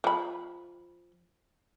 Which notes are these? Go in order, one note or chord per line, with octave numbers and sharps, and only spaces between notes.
F3 B5